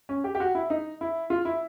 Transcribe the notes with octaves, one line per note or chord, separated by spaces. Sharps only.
C#4
G4
G4
F#4
E4
D#4
E4
F4
E4